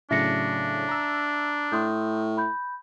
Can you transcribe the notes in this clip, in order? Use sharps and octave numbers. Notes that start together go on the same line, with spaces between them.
A2 C#3 F#3 D4 E5 A#6 C#7
A#5 E6
A2 C6 D#6 G6
B5 G6